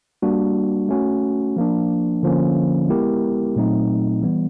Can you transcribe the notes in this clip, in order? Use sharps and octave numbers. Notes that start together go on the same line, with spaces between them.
G3 A#3 D4 F#4
A3 C#4 F#4
F3 A#3 D4
D3 F3 A#3 C#4
G#3 B3 E4 G4 A#4
A#2 F#3 A3 C4 D#4
E3 G3 B3